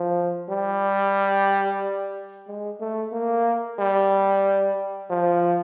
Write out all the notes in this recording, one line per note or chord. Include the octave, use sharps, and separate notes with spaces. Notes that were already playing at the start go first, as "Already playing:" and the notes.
Already playing: F3
G3
G#3
A3
A#3
G3
F3